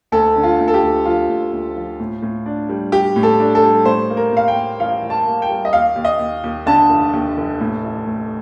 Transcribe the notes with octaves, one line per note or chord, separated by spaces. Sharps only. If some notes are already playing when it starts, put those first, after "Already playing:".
D2 A4
D3
F4
D2
A4
G4
D2
F3 F4
D2
D2
F3
A2
A2
D4
G3
G3 G4
A2
A4
D4
A4
G3
A2 C5
A#3
A#4
A2 F5
G5
A#3
A1 F5
A1
A5
A#3
G5
G3
D#5
D#2 F5
D#2
D#5
D#2
D#2
D3 A5
F1
D#2
F1
A2
A1
A3